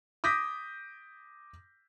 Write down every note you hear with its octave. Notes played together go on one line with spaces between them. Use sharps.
D6 D#6 G6 A#6 B6